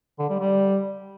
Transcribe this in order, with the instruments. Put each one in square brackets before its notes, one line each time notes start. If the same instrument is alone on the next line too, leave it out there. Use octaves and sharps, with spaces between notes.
[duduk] D3
G3
G3